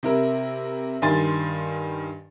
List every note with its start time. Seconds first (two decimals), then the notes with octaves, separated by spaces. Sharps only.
0.03 C3 E4 A#4
1.02 G2 D#3 G#5 C6 A6